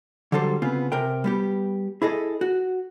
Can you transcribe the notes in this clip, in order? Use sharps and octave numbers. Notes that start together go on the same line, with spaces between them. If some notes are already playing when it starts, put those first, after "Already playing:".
D3 F#3 G3 A4 C5
C#3 B3 C4 F4
C3 A#4 G5
G3 B3 G4
E4 G#4 A4 D#5
F#4